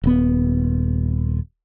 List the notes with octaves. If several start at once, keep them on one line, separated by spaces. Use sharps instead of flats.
D#1 B3